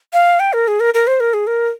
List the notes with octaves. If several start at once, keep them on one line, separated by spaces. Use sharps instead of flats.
F5
G5
A#4
G#4
A#4
A#4
C5
A#4
G#4
A#4